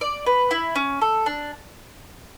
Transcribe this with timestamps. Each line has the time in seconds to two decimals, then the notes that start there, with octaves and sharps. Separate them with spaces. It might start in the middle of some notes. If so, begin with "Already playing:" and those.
0.01 D5
0.26 B4
0.51 E4
0.75 C#4
1.01 A4
1.26 D4